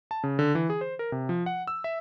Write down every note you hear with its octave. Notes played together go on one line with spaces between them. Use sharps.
A5
C#3
D3
E3
G#4
C5
A#4
C3
F3
F#5
E6
E5